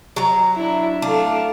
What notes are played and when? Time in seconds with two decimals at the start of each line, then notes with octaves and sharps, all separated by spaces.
0.16 F#3 A#5
0.56 D4 E4
1.02 A3 D4 F5